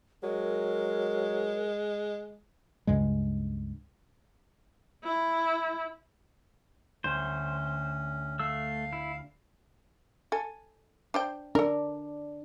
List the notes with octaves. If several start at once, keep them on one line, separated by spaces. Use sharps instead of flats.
F#3 G#3 A#4
C#2 G2 C#3 G#3
E4
D2 C#4 C5
A3 F5 E6
E4
A4 G#5
D4 C5 G5
D4 A4 A#4